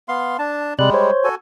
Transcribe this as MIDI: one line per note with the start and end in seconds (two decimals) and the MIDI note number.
0.08 0.37 59
0.08 0.37 77
0.08 0.37 84
0.39 0.74 62
0.39 0.74 81
0.79 0.90 48
0.79 1.11 55
0.79 1.11 56
0.79 0.90 74
0.79 0.90 90
0.94 1.29 72
0.94 1.29 73
1.24 1.35 66
1.24 1.35 69
1.24 1.35 80